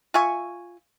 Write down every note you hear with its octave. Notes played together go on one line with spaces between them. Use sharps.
F4 E5 G#5 C#6